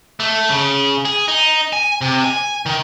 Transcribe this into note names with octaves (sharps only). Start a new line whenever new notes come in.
A3
C#3
G#4
D#4
G#5
C3
G#5
D#3